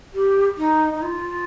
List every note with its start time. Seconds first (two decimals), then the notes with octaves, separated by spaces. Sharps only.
0.14 G4
0.58 D#4
0.94 D#4
1.02 F4